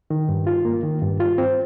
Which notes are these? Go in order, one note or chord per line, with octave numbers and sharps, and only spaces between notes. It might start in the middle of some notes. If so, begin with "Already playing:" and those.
D#3
G2
F4
A#3
D#3
G2
F4
C4